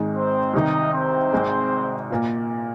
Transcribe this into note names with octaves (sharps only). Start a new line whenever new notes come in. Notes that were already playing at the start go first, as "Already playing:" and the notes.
Already playing: G#1 G#2 D#3 G#3 D#4
C4 C5
C2 C3 D#3 D#4 D#5
C4 C5
G#1 G#2 G#3
A#2 A#3 F4